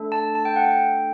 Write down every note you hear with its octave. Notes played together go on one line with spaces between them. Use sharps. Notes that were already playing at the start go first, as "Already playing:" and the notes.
Already playing: A3 D4 A4
A5
A5
G5
F#5
G5